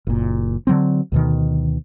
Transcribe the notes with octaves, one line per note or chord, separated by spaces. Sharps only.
F#1 A#2
D3 F#3 C4
D2 B2 D#3